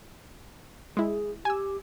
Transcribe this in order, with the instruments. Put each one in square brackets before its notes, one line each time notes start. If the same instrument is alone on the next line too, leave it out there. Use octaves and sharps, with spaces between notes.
[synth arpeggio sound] G#3 E4 [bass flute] G#4
[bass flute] G4 [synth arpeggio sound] G#5 E6